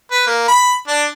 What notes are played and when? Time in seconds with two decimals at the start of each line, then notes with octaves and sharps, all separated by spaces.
0.11 B4
0.27 A#3
0.48 B5
0.88 D4